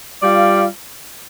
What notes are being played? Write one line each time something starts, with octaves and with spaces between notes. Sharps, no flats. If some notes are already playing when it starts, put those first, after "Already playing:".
G3 F4 D5 F5